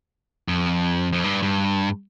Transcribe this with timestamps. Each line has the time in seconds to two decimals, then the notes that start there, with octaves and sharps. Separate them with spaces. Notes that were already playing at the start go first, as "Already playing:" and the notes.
0.48 F2
1.13 F2
1.24 G2
1.43 G2